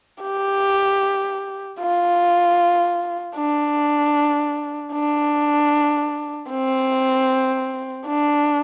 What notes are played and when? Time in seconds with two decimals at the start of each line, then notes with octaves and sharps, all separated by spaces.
0.22 G4
1.80 F4
3.37 D4
4.93 D4
6.51 C4
8.07 D4